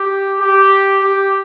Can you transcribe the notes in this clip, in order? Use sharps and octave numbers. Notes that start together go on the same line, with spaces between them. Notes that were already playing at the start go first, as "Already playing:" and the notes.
Already playing: G4
G4
G4